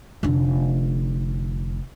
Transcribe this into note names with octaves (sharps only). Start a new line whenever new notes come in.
F1 D3